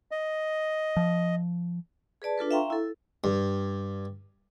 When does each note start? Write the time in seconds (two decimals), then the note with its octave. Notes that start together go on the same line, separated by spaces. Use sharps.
0.11 D#5
0.97 F3
2.22 G#4 B4 D5 A5
2.38 D4 F4 A4 B4
2.51 E5 F5 G5 A#5 C6 C#6
2.70 E4 A4
3.24 G2